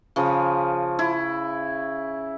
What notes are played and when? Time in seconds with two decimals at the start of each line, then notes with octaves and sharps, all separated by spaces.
0.16 C#3 F3
0.99 E4